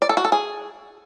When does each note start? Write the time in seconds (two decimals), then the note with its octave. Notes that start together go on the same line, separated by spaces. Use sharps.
0.02 D5
0.09 A4
0.17 F#4
0.25 A4
0.32 G#4